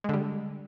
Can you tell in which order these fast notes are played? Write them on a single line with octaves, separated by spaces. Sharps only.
G#3 D3 G3